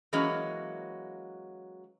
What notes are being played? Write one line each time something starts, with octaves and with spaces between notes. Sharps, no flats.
E3 F#3 G#3 A#3 C#4 F#4